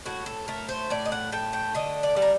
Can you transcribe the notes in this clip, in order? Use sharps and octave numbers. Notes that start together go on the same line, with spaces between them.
A2 F#4
A4
A3 A#4
C5
A2 D5
D#5
F#5
A3 G5
G5
D3 D#5
D5
G3
A#4